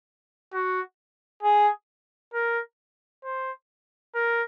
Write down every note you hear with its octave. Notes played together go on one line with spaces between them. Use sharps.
F#4
G#4
A#4
C5
A#4